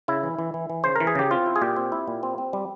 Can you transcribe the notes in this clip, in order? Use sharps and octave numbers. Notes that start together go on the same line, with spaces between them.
C#3 E4
E3
E3
E3
E3
C#3 C5
E3 A#4
G#4
C#3 G4
C4 F4
E4
G#4
A#2 G4
C4
E4
A#2
C4
C4
G3